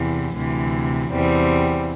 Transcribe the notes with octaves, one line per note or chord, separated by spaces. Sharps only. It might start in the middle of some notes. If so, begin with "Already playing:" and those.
Already playing: E2 C3 E3
D2 C3 E3
E2 C3 E3 G3 C4